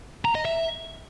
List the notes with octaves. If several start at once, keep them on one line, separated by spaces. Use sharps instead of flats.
A#5
D#5
E5